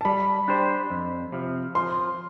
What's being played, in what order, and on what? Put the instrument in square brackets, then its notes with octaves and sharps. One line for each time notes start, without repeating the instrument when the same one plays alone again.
[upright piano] A5
[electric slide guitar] G3 [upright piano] B5
[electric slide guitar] D4 G4 C5
F2
C3 F3
[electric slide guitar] F3 [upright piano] C6